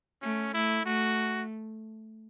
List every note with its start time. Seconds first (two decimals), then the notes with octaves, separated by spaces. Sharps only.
0.22 A3 C#4
0.54 A3 E4
0.86 A3 F#4